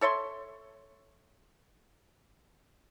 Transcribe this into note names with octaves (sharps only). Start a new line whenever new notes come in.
A4 C#5 E5 C6